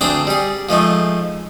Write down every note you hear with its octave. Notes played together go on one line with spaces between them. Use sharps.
D2 C4 D4 G#4 C5 A#5
G3 G#4
F3 G#3 A3 D#4